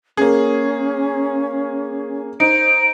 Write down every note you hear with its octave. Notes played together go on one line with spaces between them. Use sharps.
A#3 C#4 G#4
D#4 C5 D7